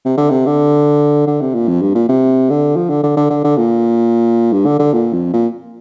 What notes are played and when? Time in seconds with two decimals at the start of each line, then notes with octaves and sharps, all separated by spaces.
0.05 C3
0.17 D3
0.30 C3
0.46 D3
1.27 D3
1.41 C3
1.54 A#2
1.68 F2
1.81 G2
1.95 A#2
2.09 C3
2.50 D3
2.76 F3
2.90 D3
3.03 D3
3.17 D3
3.30 D3
3.44 D3
3.57 A#2
4.53 G2
4.66 D3
4.79 D3
4.93 A#2
5.13 F2
5.33 A#2